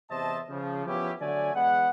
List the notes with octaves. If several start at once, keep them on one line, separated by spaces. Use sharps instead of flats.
E2 C3 C5 D#5 E5 A5
C#3 F3
F3 B3 C#4 E4 G4
D3 F#3 A3 D5 G#5
E2 G#3 B3 F#5